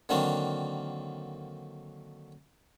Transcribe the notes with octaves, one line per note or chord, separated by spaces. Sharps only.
D3 D#3 F#3 A#3 C4 D4